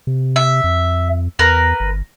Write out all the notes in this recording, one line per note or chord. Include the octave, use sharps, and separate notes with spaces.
C3
E5
F2
E2 A#4 B4
G1